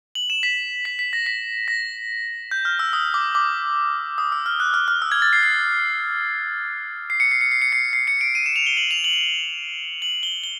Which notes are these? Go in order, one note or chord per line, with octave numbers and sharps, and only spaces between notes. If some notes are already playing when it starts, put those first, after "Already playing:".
F#7
E7
B6
B6
B6
A#6
B6
A#6
G6
F6
E6
D#6
D6
D6
D#6
E6
F6
F#6
F6
F6
E6
G#6
A6
C7
C7
C7
C#7
C7
C#7
C7
C#7
C7
C7
C#7
D7
D#7
E7
F7
G7
F#7
F7
F#7
F#7
G7
G7